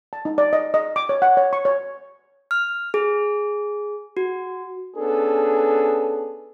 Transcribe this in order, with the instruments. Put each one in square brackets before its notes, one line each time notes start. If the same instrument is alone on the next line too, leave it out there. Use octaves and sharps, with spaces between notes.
[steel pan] A5
D#4
D5
D#5
D#5
D6
C#5
F#5
C#5
C#6
C#5
[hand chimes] F6
G#4
F#4
[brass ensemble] B3 C#4 D4 G#4 A4